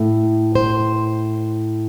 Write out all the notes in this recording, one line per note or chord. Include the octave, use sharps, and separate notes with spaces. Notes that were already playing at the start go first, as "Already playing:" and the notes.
Already playing: A2 A3
C5